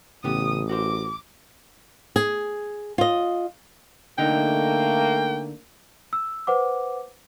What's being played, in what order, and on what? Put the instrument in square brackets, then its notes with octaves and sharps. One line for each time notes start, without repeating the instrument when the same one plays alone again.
[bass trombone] A1 [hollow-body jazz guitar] C#3 B3 G4 [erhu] D#6
[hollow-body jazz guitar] F#4 A#4 C5 [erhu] D6
[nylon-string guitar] G#4
F4 D#5
[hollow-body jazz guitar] D3 D#4 [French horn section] A3 A#3 [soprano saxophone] G5
[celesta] E6
B4 C5 F#5 D6